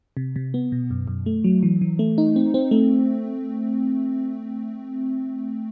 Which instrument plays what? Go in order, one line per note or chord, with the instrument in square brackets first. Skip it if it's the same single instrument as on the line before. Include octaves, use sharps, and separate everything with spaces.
[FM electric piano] C3
C3
B3
B2
F#2
F#2
A3
F#3
E3
E3
A3
D#4
C4
C4
A3